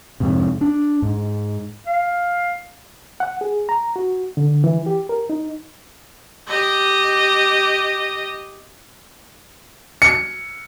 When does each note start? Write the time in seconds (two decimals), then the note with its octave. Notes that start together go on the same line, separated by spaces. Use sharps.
0.20 F2 G#2 C3
0.61 D4
1.02 G#2
1.86 F5
3.20 F#5
3.41 G#4
3.69 A#5
3.96 F#4
4.37 D3
4.64 E3
4.86 G4
5.09 A#4
5.30 D#4
6.48 G4 D#5
10.02 C#7